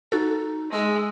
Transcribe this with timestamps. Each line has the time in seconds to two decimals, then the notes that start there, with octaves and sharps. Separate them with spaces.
0.12 D#4 F#4 A4
0.72 G#3 E6